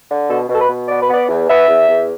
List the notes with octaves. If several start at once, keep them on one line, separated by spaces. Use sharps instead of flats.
D3
B2 A4
B2 A4
B4
B2
B3 D5
B4
B3 D5
E2
B3 E5
E2
E2